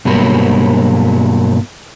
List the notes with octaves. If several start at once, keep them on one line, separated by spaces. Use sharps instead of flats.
G2 B2 F#3 G3 A#3